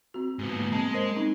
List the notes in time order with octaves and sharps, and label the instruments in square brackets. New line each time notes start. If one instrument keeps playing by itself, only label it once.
[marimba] C4 F#4
[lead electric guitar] G#2 B3
[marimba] A#3
[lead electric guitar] G#3 [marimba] C4 A5
[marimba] A#4 C5 D#5
C4 C#4 D#4